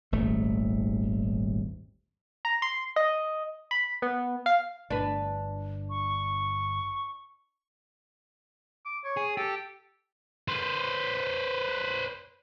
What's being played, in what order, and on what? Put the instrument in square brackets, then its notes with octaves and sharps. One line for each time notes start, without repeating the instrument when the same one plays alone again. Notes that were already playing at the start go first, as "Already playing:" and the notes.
[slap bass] D#1 G#1 A3
[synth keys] A#5
C6
D#5
B5
B3
F5
[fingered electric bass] G1 [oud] D4 B4
[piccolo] C#6
[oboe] D6
C#5
[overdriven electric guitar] G#4
[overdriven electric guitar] G4 [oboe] A4
[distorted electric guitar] B4 C5